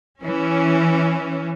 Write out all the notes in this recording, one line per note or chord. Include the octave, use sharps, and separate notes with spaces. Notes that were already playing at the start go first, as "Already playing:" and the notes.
E3 C#4